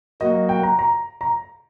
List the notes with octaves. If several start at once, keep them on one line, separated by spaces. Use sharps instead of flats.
F#3 A#3 F#4 D#5
G5
A#5
A#5
A#5